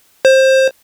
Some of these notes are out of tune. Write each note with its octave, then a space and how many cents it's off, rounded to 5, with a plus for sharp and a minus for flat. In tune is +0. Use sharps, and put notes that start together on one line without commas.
C5 +20